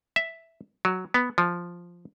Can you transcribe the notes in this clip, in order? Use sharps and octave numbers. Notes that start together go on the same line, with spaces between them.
E5
F#3
B3
F3